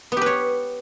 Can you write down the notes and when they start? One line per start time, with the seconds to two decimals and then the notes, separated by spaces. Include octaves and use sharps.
0.12 B3
0.17 G4
0.21 B4
0.26 C#5